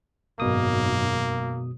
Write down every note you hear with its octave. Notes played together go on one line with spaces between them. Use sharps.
G#1 F#2 B2 A#3 D#6